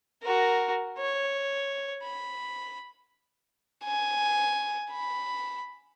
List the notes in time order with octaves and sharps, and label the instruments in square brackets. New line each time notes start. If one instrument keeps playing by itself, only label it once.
[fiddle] F#4 A#4
C#5
B5
[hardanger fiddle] G#5
B5